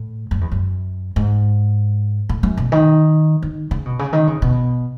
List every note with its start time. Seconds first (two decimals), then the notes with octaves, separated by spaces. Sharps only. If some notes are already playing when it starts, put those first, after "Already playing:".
Already playing: A2
0.31 F#2
0.41 E2
0.52 F#2
1.16 G#2
2.29 A2
2.43 F#2
2.57 B2
2.72 D#3
3.43 D#3
3.71 C#3
3.86 B2
3.99 C#3
4.13 D#3
4.27 C#3
4.42 B2